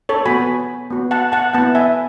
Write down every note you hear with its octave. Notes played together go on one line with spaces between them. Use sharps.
A4 C#5
B3 F#4 G#5 B5
B3 F#4
F#5 A5
F#5 A5
B3 E4 F#5 A5
E5 G#5